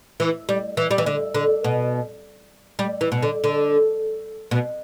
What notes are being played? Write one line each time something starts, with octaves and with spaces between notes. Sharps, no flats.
E3
G3
E3
G3
E3
D3
D3
B2
G3
E3
B2
D3
D3
B2